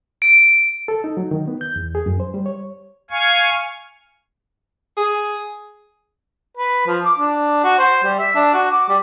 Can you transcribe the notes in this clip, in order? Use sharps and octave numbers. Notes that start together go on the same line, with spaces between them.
D7
A4
D#4
F#3
D#3
B3
G6
E2
G#4
F#2
C5
G3
C#5
F5 G#5 C#6
G#4
B4
F3
D6
D4
F#4
C5
G3
E5
D4
F#4
D6
G3